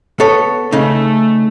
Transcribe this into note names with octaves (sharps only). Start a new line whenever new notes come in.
B3 A4 C#5
C#3 A3 D#4